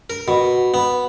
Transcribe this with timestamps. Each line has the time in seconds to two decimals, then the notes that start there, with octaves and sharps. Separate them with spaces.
0.10 A#4
0.28 B2
0.74 B3